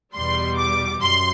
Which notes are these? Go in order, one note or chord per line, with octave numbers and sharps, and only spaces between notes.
E2 B2 G3 C6
D6
F#2 C6